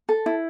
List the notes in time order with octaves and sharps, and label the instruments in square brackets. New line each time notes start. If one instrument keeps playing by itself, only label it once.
[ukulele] A4
E4